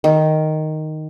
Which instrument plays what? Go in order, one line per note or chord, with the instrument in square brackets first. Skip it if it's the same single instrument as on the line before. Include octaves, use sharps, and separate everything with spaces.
[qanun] D#3